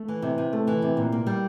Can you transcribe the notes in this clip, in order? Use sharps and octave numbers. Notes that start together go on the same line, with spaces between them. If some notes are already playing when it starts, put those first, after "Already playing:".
Already playing: A3
E3
C3
C3
A3
E3
C3
A#2
A#3
G3